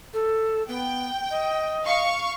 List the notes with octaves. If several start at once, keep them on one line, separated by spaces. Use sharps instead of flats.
A4
B3 G5
D#5
F5 C#6